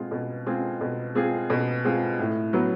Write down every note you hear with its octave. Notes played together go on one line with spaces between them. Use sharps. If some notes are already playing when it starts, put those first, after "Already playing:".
Already playing: B2 G#3 C4 F4 G#4
B2
G#3 C4 F4 G#4
B2
G#3 C4 F4 G#4
B2
G#3 C4 F4 G#4
A2
F#3 B3